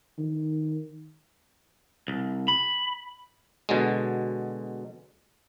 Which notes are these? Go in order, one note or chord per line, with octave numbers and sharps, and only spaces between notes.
D#3
C2
B5
B2 D3 F#3 G#3